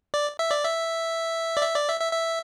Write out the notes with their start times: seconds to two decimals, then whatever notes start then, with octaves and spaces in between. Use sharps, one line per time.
0.14 D5
0.39 E5
0.51 D5
0.64 E5
1.57 D5
1.62 E5
1.76 D5
1.88 E5
2.00 E5
2.13 E5